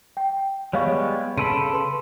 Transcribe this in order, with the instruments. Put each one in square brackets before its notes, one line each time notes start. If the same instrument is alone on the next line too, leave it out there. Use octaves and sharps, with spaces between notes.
[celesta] G5
[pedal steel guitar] G3 G#3 B3 [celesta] C#5 F5 C#6
[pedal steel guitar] C#3 A4 B5 [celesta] C6 D7 D#7
[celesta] B4 C6